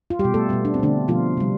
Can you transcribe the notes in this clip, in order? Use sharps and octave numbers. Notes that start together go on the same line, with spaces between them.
F4
G3 G4
B2
A3 A4
B2 G3 B3
D4
C4
B2 D3 A3 D4
B2 F3 A3 F4
C3 G3